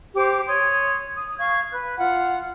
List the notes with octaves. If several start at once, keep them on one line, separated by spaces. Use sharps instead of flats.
G4 C5 D6
C#5 C6 D#6
D#6
F5 C#6 G#6
B4 F#6
F4 F#5